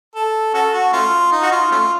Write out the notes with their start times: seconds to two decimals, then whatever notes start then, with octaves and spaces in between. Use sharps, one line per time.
0.15 A4
0.54 C#4 F#4 A4
0.73 F#4
0.93 A3 C#4 F4
1.32 D#4
1.42 F#4
1.52 F4
1.71 A3 C#4 F4